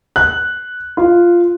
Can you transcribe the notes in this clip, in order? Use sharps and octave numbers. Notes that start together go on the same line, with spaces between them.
F#6
F4